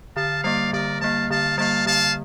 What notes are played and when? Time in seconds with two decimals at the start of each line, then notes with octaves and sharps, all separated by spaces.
0.16 D3 F5 A5
0.44 G3 A#3 D5 F5
0.73 D3 A#4 D5
1.01 G3 A#3 F5 A5
1.30 D3 F5 A5
1.58 G3 A#3 F5 A5
1.86 D3 F5 A5